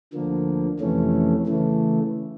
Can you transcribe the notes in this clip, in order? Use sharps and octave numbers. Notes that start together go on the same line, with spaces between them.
D2 D3 F3 A#3
F2 C3 E3 A3 C#4
C#3 E3 A3